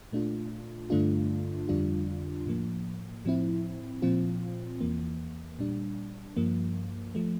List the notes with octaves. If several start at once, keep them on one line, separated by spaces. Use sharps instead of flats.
A#2 A3 D4 F4
G2 D3 A3 D4 F4
F2 D3 G3 D4 F4
A2 F3 A#3
A2 F3 C4 E4
A#2 F3 C4 F4
E2 E3 A#3
A#2 G3 D4
G2 F3 A#3
F3 A3